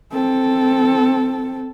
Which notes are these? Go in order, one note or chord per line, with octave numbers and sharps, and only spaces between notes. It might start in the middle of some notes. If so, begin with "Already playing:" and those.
C4 A4